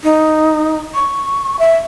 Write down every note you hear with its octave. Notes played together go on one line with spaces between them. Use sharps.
D#4
C#6
E5